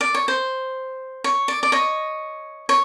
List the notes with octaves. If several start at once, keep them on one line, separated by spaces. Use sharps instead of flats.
D5
C#5
C5
C#5
D5
D5
C#5 D#5
C#5